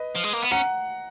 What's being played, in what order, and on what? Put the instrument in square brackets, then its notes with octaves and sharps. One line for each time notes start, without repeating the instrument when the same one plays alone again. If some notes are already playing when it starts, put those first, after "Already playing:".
Already playing: [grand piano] B4 D#5
[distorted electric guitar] F3
G#3
A#3
B3
[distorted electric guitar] C#4 [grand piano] F#5 A#5